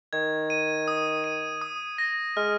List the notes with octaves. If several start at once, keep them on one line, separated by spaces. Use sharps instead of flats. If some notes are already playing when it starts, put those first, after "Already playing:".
D#3 G#6
D#7
D#6
D#7
D#6
A#6
G#3 F6